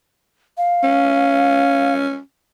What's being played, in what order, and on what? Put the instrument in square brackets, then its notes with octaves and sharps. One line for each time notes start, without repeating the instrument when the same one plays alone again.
[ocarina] F5
[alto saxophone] C#4